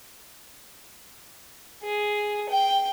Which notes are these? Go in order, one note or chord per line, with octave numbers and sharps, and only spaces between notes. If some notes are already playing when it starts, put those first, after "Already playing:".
G#4
G5